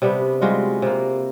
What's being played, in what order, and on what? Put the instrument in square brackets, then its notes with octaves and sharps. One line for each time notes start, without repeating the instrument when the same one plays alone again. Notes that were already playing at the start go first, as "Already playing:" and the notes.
[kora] C3 G3 B3 D4
G3 G#3 F4 F#4
C3 A#3